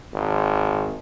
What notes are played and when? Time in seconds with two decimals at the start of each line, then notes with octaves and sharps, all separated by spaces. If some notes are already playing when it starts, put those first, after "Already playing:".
0.14 G#1